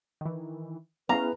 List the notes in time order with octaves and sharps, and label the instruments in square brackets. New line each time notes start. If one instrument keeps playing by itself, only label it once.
[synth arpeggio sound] D#3 E3
[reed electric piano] B3 E4 G#4 [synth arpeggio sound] C#4 F5 [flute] B4 [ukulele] A#5